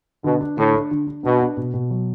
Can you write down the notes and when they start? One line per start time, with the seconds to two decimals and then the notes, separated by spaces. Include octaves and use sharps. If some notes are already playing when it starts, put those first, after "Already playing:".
0.24 B2 D3
0.41 D4
0.57 A2 D3
0.74 D4
0.91 D3
1.07 D4
1.24 B2 D4
1.41 D4
1.57 B2
1.74 B2
1.91 F#3